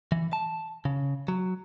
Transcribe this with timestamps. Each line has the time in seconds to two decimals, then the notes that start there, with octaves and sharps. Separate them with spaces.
0.12 E3
0.33 A5
0.85 C#3
1.28 F#3